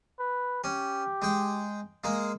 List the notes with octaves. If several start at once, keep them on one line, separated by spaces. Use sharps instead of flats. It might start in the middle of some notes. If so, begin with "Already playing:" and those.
B4
C#4 G4
G#3 G5
G#3 A#3